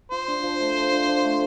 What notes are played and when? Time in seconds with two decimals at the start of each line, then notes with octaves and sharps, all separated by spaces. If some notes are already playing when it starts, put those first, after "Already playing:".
0.11 F4 C5
0.28 D4
0.43 F3
0.60 A3
0.76 F4
0.92 D4
1.08 F3
1.24 A3